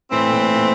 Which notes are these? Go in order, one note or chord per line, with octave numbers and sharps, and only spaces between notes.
A2 E3 A3 C4
A#2
A2
A#2